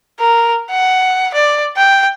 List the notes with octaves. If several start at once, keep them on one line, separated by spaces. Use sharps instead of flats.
A#4
F#5
D5
G5